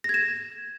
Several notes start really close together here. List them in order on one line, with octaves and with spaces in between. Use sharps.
A#6 G#6 E7